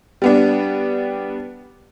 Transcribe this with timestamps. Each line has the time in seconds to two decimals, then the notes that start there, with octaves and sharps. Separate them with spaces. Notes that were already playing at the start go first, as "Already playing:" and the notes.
0.22 G3 B3 D4